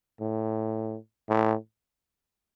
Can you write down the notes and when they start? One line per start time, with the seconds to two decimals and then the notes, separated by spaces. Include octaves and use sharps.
0.21 A2
1.29 A2